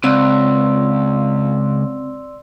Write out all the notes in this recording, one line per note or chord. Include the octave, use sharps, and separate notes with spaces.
C#2 C4 D5 C6 E6